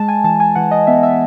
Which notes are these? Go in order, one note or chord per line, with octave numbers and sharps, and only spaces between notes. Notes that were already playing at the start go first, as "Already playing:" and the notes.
Already playing: G#3 A5
G#5
E3 A5
G#5
E3 F#5
D#5
B3 E5
E5